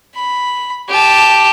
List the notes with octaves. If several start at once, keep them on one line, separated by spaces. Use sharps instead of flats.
B5
G4 A5